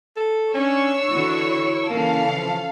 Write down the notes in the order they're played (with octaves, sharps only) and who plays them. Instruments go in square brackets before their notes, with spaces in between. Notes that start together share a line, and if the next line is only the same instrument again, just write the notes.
[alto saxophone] A4
[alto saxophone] C#4 [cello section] D4 [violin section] C#5 C#6 E6
[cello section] D3 E3 F#4 [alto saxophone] E4
[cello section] C#3 E3 C#4 [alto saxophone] A#3 [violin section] A4 F5
[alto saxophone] F3